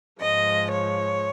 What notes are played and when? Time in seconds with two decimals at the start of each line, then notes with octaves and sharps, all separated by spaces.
0.22 G#2 F3 G#3 D#5
0.72 C#5